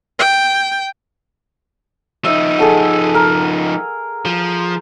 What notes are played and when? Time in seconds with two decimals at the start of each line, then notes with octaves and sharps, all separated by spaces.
0.19 G5
2.25 F3 D#4 E5
2.58 G#4 A4 F#5
3.15 A#4
4.25 F3